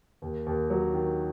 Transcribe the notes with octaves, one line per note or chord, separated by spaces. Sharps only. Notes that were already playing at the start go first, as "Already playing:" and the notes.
D#2
D#2
F#3
D#3